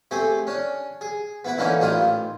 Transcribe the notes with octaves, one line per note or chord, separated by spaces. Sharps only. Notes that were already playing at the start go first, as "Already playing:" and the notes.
A3 C4 G4 G#4
C#4 D4
G#4
B3 E4 B4
D3 E3 A#3 C#4 D#4 E4
A1 D#3 D4 E4 F4 D#6